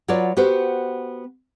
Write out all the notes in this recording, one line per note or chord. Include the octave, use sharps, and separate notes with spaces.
F#3 F4 B4 C#5 D5
B3 F#4 G4 B4 C5